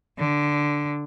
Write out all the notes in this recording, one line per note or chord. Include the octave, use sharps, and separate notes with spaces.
D3